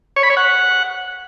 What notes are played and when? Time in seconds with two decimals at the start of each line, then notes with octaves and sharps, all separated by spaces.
0.16 C#5
0.23 B5
0.30 C#5
0.37 F#5